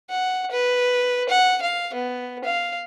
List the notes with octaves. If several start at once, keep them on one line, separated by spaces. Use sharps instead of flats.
F#5
B4
F#5
F5
B3
F5